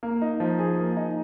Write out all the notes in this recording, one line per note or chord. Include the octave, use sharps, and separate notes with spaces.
A#3
D#4
F3
G#4
A#3
D#4